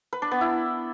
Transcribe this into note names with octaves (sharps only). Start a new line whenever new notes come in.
B4
D4
B3
E4